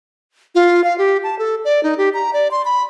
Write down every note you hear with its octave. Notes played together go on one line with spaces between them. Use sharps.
F4
F5
G4
A5
A4
D5
D#4
G4
A#5
D5
C6
B5